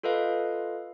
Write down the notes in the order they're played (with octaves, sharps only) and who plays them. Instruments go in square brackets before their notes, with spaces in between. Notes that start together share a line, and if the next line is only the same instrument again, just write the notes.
[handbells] F4 A4 B4 D#5 F5